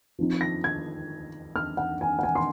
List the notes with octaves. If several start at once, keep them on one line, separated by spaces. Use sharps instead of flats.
F3 C4 D#4
A#6
G#6
F6
F#5
G#5
F#5
G#5
C6